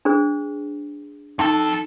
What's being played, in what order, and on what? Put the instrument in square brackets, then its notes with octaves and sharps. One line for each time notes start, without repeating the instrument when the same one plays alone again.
[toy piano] D4 G#4 C5
[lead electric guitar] F2 A4 [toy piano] D#4